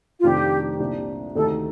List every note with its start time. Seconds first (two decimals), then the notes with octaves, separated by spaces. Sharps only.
0.19 F4
0.23 F1 F2 D#3 A3 D4 G4
0.80 C2 A#2 G3 D4
1.35 D2 C3 D#3 A3 D#4 A4